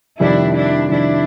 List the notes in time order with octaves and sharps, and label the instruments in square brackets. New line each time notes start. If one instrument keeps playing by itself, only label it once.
[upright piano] F2 C3 D#3 G3 [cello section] D4 E4
[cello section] D4 E4
[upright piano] F2 C3 D#3 G3 [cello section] D4 E4